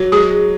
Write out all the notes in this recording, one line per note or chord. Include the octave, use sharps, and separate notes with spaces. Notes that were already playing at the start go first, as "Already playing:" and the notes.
Already playing: F#3 F#4
G#3 G#4